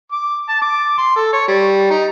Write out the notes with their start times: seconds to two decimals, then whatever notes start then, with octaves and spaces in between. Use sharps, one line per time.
0.12 D6
0.49 A5
0.62 D6
0.98 C6
1.16 A4
1.33 C#5
1.48 G3
1.91 D#4